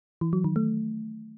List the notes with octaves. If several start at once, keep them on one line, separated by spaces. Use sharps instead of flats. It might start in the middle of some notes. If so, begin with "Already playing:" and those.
E3
F#3
D#3
A3